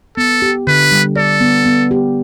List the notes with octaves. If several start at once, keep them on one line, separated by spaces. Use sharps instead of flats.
B3 A4
G4
D3 B4
G3
A4 D5
B3
B3
G4